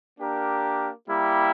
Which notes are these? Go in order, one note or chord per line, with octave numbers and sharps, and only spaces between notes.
A#3 D4 G4 A#4
G3 A#3 E4 G4